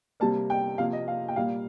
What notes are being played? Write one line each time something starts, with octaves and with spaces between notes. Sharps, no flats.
C3 G3 A#3 A5
G5
C3 F3 A#3 F5
D#5
F5
G5
A#2 G3 A#3 F5